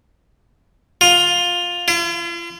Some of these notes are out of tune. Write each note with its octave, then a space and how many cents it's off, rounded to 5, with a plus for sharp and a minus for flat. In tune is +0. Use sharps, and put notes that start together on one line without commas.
F4 +10
F4 -45